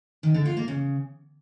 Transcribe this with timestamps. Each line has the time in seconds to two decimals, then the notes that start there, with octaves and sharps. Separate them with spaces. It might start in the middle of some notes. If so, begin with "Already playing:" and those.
0.23 D#3
0.34 D3
0.45 F4
0.57 A#3
0.68 C#3